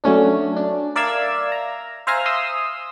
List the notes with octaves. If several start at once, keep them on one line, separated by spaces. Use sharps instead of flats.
F#3 A3 C#4 D4
D4
A#4 D5 E5 F5 E6 G#6
A#5
C5 E5 F5 G#5 A#5 F6
C6 D#6 E6